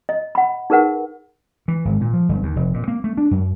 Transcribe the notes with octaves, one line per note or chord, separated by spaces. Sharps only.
D#5
F#5 B5
D#4 G#4 A#4 B4 F#5
E3
G#1
A#2
F3
G1
D#2
F1
A#2
A#3
A3
D4
F#2